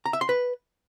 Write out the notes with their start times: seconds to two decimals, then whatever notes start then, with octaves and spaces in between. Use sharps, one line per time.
0.06 A#5
0.13 E5
0.21 C6
0.29 B4